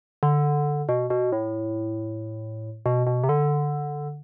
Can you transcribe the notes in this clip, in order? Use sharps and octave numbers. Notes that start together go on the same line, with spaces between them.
D3
B2
B2
A2
B2
B2
C3
D3